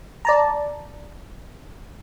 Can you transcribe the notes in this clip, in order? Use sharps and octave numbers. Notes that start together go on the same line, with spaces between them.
D5 A5 A#5